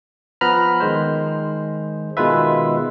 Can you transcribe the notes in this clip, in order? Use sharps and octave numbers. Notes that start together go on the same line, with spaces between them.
F3 B3 B4 A#5 B5 F6
D#3 G#3 C5
B2 D#3 G#3 F4 B4 E5